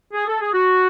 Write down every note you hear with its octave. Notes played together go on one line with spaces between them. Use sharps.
G#4
A4
G#4
F#4